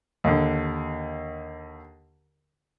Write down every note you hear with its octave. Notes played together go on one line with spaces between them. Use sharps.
D#2 D3